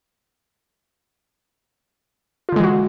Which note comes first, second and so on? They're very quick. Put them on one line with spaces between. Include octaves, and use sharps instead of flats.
F4 D3 G#3 E3 F#4